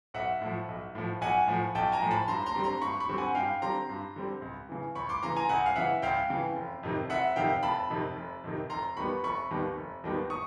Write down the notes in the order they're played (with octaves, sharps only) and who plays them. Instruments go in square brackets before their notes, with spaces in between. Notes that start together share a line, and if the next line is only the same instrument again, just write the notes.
[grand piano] B1 E5 F#5
A2 F3
B1
A2 F3
B1 F#5 G#5
A2 F3
B1 G5 A5
G#5 A#5
A2 F3
A5 B5
G2 A#5 C6
A#5 C6
D3 G3 C4
A#5 C6
G2 B5 C#6
B5 C#6
D3 G3 C4
F#5 G#5
G2 F5 G5
D3 G3 C4 A#5 C6
G2
D3 G3 C4
C#2
C#3 E3
C#2 B5 C#6
C6 D6
C#3 E3 A#5 C6
G#5 A#5
C#2 F#5 G#5
F5
C#3 E3 E5 F#5
C#2 F5 G5
C#3 E3
F1
F2 C3 D#3
F1 E5 F#5
F2 C3 D#3 F5 G5
F1 A5 B5
F2 C3 D#3
F1
F2 C3 D#3
F1 A#5 C6
D#2 D#3 G3 B3 B5 C#6
F1 B5 C#6
D#2 D#3 G3 B3
F1
D#2 D#3 G3 B3
C#6 D#6